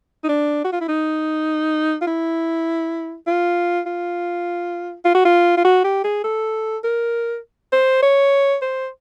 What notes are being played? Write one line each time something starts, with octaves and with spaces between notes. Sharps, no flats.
D#4
D4
F#4
F4
E4
D#4
F4
E4
F4
F4
F4
F#4
F4
F4
F#4
G4
G#4
A4
A#4
C5
C#5
C5